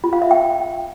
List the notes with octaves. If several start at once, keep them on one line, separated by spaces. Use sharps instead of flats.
F4
F5
E5
G5